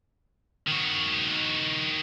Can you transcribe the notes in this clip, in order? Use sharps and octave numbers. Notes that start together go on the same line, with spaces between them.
D#3 F#4